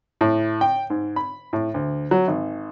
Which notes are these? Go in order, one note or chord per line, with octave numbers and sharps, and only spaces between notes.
A2
G5
G#2
B5
A2
D2
F#3
G#1